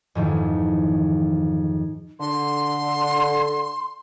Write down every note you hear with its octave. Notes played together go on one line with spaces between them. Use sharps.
F2 G#2 D#3 E3
D3 C6